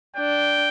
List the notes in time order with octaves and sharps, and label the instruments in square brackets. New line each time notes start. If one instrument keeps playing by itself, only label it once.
[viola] D4 [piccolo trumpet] G5